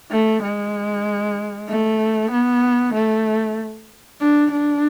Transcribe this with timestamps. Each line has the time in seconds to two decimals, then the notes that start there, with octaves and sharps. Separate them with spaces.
0.11 A3
0.43 G#3
1.69 A3
2.31 B3
2.94 A3
4.20 D4
4.51 D4